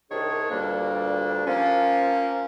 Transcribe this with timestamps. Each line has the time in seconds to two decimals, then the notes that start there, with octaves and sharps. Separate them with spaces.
0.11 C2 C3 D#3 D4 G#4 C#5
0.51 D2 G2 A#2 G3 A#3 D4
1.47 F3 A#3 C4 C#4